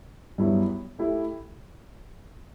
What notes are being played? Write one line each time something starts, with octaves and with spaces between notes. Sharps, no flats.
G2 F#3 B3 E4 G4
A3 E4 G4